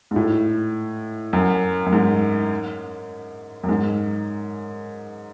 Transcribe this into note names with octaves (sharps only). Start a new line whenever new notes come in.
G#2
A2
F#2
F#2
G#2
F#2
G#2